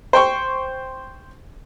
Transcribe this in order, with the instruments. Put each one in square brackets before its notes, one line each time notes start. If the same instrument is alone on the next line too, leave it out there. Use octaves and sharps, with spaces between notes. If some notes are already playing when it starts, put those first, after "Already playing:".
[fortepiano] C5 G5 C#6